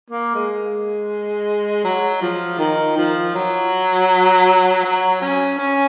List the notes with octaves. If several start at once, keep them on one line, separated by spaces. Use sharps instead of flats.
A#3
G#3
F#3
F3
D#3
F3
F#3
F#3
C#4
C#4